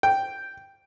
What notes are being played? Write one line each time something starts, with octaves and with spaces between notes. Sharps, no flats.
G5